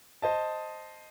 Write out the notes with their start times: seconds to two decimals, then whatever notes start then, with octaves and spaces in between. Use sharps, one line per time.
0.22 C5 D#5 A5